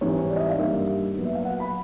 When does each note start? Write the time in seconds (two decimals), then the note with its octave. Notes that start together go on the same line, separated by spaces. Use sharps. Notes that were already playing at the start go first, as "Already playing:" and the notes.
0.01 G#2 E3 G3 C4 C#5
0.30 D5
0.36 D#5
0.40 E5
0.50 F5
0.58 G2 D#3 G3 A#3 E5
1.17 A#2 F#3 B3
1.25 E5
1.35 F5
1.45 F#5
1.60 B5